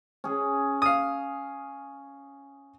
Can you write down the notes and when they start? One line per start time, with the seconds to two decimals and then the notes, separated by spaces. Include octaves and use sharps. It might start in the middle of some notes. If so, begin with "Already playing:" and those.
0.24 C#4 G#4
0.82 F5 D#6